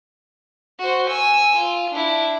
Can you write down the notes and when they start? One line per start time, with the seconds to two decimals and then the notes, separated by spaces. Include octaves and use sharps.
0.79 F#4 C5
1.09 G#5 E6
1.56 F4
1.91 D4 E4